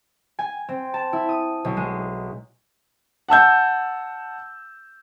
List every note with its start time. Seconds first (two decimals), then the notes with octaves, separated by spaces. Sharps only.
0.39 G#5
0.69 C4
0.94 A5
1.13 E4
1.29 D#6
1.65 B1
1.77 G#3
3.29 F#5 A5 E6 G6